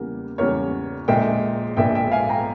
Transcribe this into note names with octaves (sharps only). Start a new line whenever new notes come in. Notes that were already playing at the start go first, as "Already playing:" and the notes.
Already playing: E2 C#3 G3 A#3 A#4
E2 C#3 G3 A#3 A#4 C#5
A#1 A#2 G#3 E5 G5
A#1 A#2 G#3 E5 G5
E5 G5
F5 G#5
G5 A#5